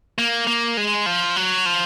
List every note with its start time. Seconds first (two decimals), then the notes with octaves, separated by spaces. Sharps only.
0.18 A#3
0.47 A#3
0.77 G#3
1.06 F3
1.36 F#3
1.66 F3